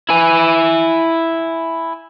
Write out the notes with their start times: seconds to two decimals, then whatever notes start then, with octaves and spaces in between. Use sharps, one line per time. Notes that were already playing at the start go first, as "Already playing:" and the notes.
0.09 E4 G#5